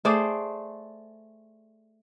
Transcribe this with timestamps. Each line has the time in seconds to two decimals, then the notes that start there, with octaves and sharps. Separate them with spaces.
0.05 A3 G#4 C5 D5